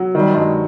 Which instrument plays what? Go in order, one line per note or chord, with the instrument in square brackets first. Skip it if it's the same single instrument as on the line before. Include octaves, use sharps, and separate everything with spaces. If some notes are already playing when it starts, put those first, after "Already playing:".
Already playing: [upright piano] F#3
[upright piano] D#3 [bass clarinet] G3
[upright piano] G2 [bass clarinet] G#3